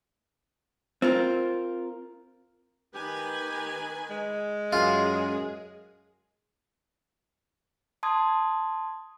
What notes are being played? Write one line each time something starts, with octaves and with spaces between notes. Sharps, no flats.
C4 F4 A#4
D#3 G4 B4 G#5
G#3
F#2 F4 G#4
A5 C6 D#6 G#6